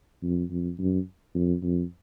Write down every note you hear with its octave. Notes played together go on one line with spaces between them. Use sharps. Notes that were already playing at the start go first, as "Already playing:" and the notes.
F2
F2
F#2
F2
F2